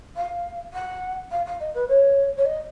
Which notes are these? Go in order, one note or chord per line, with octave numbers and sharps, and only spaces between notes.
F5
F#5
F5
F5
D#5
B4
C#5
C#5
D#5